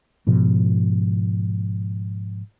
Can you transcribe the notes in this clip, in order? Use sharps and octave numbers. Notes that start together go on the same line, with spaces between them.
G#2 B2 F3